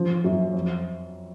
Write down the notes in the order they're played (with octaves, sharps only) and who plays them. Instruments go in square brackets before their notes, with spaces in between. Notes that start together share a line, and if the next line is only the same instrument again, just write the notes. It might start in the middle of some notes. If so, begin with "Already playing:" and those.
Already playing: [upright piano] F3 C#4
F#2
F2